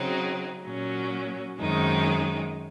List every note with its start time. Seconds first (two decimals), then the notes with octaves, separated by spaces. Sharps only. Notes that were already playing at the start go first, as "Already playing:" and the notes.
Already playing: C#3 F#3 C4 D#4
0.64 A#2 F#3 C#4
1.59 F#2 D#3 G#3 C4 D#4